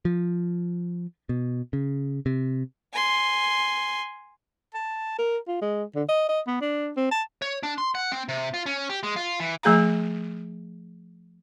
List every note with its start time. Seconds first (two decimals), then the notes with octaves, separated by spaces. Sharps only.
0.05 F3
1.29 B2
1.73 C#3
2.26 C3
2.93 G#5 C6
4.74 A5
5.18 A#4
5.48 F4
5.61 G#3
5.95 D3
6.09 D#5
6.29 D#5
6.47 B3
6.61 D4
6.97 C4
7.11 A5
7.42 C#5
7.63 D4
7.78 C6
7.95 F#5
8.12 C4
8.29 C3
8.54 F4
8.66 C#4
8.90 G4
9.03 G#3
9.16 F4
9.40 E3
9.63 F3 A3 G#4 F5 A#5